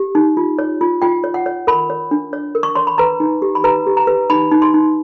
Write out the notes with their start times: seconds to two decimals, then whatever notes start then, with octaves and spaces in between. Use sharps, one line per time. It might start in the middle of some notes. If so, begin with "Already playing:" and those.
Already playing: G4
0.15 D#4
0.37 F4
0.59 C#5
0.81 F4
1.02 F4 G5
1.24 C#5
1.34 F#5
1.46 C#5
1.67 A#4 B5
1.90 C#5
2.11 D4
2.33 C#5
2.55 A#4
2.63 C#6
2.75 C#5 C6
2.87 B5
2.98 B4 A#5
3.20 D#4
3.42 G4
3.55 B5
3.64 B4 A#5
3.87 G4
3.97 A#5
4.07 B4
4.30 D#4 B5
4.51 D#4
4.62 C6
4.74 D#4